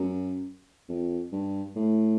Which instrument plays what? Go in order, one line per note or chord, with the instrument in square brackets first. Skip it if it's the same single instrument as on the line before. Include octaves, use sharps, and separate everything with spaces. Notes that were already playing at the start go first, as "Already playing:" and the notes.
Already playing: [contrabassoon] F#2
F2
G2
A2